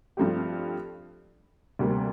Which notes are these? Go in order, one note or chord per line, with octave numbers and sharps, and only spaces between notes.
G2 F3 A3 C4 G4
D2 C3 G3 A#3